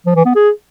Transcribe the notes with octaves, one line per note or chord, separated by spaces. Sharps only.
F3
E3
B3
G#4